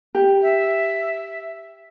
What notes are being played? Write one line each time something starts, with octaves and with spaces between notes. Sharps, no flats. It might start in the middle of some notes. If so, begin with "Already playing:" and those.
G4
E5